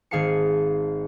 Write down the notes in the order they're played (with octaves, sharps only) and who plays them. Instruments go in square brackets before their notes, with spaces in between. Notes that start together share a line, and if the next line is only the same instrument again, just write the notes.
[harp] G#1 G#4 F5 A5 C#7